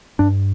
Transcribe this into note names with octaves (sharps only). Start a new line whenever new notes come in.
G2 D4